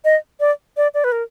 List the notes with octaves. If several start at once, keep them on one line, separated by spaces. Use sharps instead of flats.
D#5
D5
D5
D5
B4
A#4